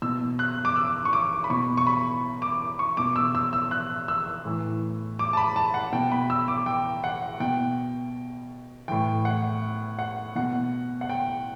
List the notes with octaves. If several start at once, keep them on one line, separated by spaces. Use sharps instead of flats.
B2 E6
F#6
D6
E6
C#6
D6
B5
B2 C#6
C#6
B5
D6
C#6
B2 D6
E6
E6
E6
F#6
E6
A2 E3
D6
A5
B5
A5
F#5
B2 G5
B5
E6
D6
G5
F#5
B2 G5
A2 E3 G5
F#5
F#5
B2 F#5
F#5
G5